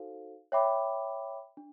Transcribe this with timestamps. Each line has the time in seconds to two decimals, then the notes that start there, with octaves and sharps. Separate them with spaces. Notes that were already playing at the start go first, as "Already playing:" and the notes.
Already playing: D#4 F#4 A4 C5 F5
0.52 C#5 E5 G5 B5 D6
1.57 D4